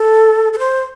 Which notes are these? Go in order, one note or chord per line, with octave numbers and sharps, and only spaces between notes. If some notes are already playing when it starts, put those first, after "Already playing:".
Already playing: A4
A4
C5